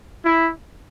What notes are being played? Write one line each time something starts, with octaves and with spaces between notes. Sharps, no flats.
E4